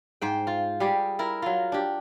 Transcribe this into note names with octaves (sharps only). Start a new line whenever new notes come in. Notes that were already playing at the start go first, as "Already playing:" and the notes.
G#2 C5 G5
F4
G3 G4 G#4
E4 A#4
F#3 F4
D4 G4